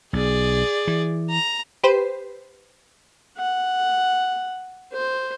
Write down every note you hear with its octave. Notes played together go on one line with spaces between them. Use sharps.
B1 G#4 D5
E3
A#5
G4 B4 C5
F#5
C5